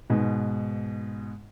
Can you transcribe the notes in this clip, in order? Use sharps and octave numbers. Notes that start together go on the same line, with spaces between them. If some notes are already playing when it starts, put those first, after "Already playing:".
G#2 B2